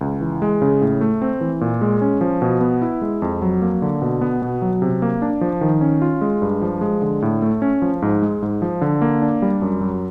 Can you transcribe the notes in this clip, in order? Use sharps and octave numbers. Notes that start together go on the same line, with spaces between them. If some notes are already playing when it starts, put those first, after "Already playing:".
C#2
E3
G#3
C#3
A2
A3
C4
E3
A#2
G#3
C#4
F3
B2
B3
E4
G#3
F2
F#3
A#3
D3
B2
B3
B2
F#3
C3
A#3
D4
F3
D#3
C#4
F4
G#3
G2
F3
G#3
D3
A2
A3
C#4
F3
G#2
G#3
G#2
F3
D3
A#3
D4
G3
F#2
F#3